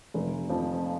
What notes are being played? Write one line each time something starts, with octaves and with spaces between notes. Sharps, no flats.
F1
F2 F3